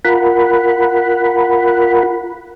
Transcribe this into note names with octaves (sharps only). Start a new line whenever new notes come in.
F4 A#4 F#5 B5